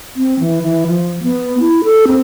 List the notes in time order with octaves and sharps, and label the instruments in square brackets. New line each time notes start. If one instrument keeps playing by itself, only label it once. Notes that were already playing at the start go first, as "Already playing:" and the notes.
[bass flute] C4
E3
E3
F3
B3
E4
A4
C4